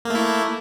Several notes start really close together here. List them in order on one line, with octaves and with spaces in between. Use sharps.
A#3 A3 E4